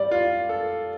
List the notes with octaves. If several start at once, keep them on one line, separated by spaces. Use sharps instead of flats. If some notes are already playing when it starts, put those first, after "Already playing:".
Already playing: G3 D5
F4
A4